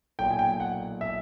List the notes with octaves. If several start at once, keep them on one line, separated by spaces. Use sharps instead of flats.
B1 A#2 G5
G#5
G5
F#5
E5